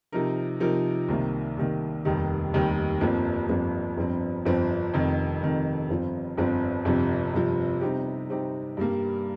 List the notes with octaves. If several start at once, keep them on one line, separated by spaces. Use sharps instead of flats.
C3 F3 D#4 A#4
C3 F3 D#4 A#4
C2 C3 D#3 A#3
C2 C3 D#3 A#3
F1 D#2 D#3 G3
F1 D#2 D#3 G3
G1 F2 F3 A#3
G1 F2 F3 A#3
G1 F2 F3 C4
G1 F2 F3 C4
F1 F2 D#3
F1 F2 D#3
G1 F2 F3 C4 F4
G1 F2 F3 C4 F4
G1 F2 C3 F3
G1 F2 C3 F3
C3 G3 C4 D#4 G4
C3 G3 C4 D#4 G4
G2 G3 A#3